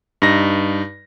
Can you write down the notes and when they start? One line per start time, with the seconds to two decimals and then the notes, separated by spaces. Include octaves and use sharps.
0.22 G2 D#4 A#6